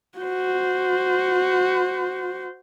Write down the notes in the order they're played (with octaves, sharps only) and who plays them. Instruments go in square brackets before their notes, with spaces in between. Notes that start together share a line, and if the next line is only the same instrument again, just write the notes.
[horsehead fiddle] F#4 C5